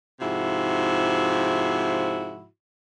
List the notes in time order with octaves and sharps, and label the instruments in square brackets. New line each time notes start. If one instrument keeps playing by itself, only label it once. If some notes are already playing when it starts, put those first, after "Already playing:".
[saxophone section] G#2 C3 F3 E4 F#4